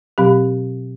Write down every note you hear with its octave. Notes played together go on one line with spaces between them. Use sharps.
B2 F#3 C4 G4